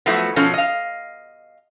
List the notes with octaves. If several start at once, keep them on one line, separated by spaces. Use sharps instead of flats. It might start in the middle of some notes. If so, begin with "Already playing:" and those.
F3 F#3 A3 B3 E4
B2 F3 C#4 A4
D#5 F5